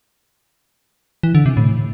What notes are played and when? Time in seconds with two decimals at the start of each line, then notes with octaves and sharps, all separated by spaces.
1.23 E3
1.35 D3
1.46 C3
1.57 A2